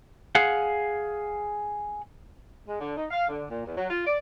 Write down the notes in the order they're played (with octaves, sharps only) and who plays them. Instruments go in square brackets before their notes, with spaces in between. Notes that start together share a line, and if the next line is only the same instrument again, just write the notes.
[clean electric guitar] G#4 F5 F#5
[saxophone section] G#3
D3
D#4
F5
D3
A#2
E2
F#3
F4
D5